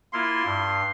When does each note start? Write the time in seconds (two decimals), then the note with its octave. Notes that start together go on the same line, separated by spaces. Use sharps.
0.13 A#3 E4 F4 C6
0.44 G2